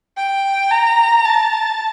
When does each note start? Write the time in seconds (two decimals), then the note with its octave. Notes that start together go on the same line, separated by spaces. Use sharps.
0.17 G5
0.71 A#5
1.25 A5